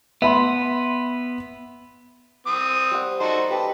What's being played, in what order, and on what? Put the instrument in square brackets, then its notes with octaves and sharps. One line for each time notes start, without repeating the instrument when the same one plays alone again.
[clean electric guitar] B3 [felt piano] E5 B5 C6
[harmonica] C4 D#6
[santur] G3 C5 F#5
[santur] D#4 D5 [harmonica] F#4 A4 C5
[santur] G4 A5 [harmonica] B4